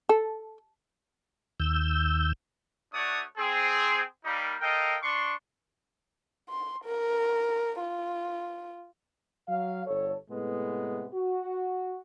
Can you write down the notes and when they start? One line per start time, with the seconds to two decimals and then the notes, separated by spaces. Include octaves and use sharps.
0.09 A4
1.60 D#2 E6 G6
2.94 A3 D4 F#4 C#5 D5 D#6
3.38 C4 G#4
4.25 G3 A#3 D#4
4.61 A4 A#4 D#5 F5 G5
5.03 D4 C6 C#6
6.49 C6
6.85 A#4
7.80 F4
9.49 F#3 F5
9.86 G1 A4 C#5
10.30 A2 C3 G#3 B3
11.14 F#4